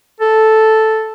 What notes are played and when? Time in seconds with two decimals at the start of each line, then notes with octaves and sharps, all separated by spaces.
0.20 A4